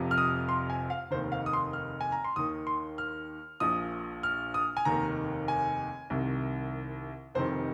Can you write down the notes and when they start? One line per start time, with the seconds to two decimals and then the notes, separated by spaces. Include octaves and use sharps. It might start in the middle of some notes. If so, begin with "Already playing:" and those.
Already playing: F1 F2 C3 F3
0.11 F6
0.18 D#6
0.49 C6
0.70 G#5
0.90 F5
1.11 F1 D#2 D#3 C5
1.32 F5
1.46 D#6
1.53 C6
1.73 F6
2.01 G#5
2.12 A#5
2.24 C6
2.36 D#2 D#3 D#6
2.67 C6
2.98 F6
3.60 A#1 A#2 F3 D#6
4.23 F6
4.54 D#6
4.77 G#5
4.85 F1 D#2 D#3 A#5
5.48 G#5
6.10 C2 C3 D#3
7.35 F1 F2 C3 D#3 C5